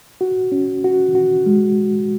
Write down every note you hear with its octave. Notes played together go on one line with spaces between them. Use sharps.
F#4
C#4
F#4
F#4
G#3